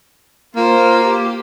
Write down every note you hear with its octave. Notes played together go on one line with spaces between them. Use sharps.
A#3 F4 C5
G4